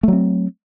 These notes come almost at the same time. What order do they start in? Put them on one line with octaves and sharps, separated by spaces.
A3 F#3 C4